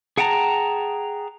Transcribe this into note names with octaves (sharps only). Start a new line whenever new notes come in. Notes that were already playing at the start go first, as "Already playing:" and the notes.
G#4 F#5 G5 A5 A#5